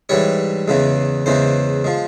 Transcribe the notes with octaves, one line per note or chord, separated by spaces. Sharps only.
G#2 E3 G3 C#5
E2 C#3 E3 G#3
E2 C#3 E3 G#3 C5
F3 G#3